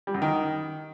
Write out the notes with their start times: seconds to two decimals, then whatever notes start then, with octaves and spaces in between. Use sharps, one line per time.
0.07 G3
0.14 F#2
0.22 D#3